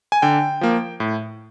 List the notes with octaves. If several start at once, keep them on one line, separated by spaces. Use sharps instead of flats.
G#5
D3 G5
F3 A#3
A2